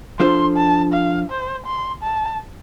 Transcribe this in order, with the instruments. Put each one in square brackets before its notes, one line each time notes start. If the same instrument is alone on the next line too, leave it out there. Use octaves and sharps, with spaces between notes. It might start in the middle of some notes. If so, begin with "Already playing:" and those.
[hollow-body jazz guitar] F3 D4 F4 A4 C5 [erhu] C6
[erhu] A5
F5
C5
C6
A5